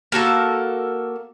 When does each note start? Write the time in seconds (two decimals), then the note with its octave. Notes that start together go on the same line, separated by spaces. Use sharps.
0.12 A#3 F#4 A4 A#4